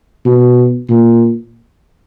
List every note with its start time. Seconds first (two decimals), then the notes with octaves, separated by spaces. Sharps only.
0.25 B2
0.90 A#2